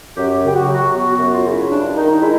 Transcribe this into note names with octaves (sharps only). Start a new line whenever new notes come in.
F#2 G4
C#3 G4
F#4
F#3
F#4
B3 F#4
F#4
F#2
F4
C#3
E4
G2 D4
D#3 D#4
D#4
G#3 E4